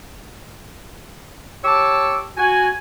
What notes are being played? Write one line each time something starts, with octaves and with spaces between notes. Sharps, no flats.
G4 C#5 A5 C#6 D6 E6
F#4 G#5